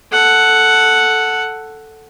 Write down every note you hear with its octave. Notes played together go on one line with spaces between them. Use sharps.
A4 F#5